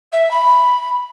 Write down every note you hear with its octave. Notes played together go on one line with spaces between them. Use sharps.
E5
B5